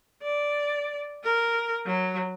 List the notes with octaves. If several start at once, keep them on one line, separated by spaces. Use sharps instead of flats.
D5
A#4
F#3